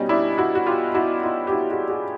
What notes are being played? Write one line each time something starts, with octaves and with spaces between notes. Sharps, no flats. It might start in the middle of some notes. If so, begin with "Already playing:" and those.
Already playing: B2 G3 C#4 D#4
D4 E4
E4 F#4
F#4
F4 G4
E4 F#4
D#4 F4
G4
E4 F#4
F#4 G#4
F#4 G#4